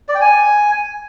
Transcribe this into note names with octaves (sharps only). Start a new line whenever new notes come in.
D5
G5
G#5